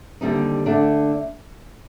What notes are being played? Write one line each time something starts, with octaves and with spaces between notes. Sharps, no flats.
D#2 D3 G3 C4 D#4
D3 A3 D4